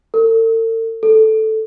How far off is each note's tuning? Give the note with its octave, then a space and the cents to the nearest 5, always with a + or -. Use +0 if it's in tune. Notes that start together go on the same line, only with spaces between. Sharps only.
A4 +45
A4 -5